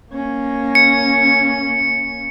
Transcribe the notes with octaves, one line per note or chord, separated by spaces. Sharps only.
A#3 C#4
C#7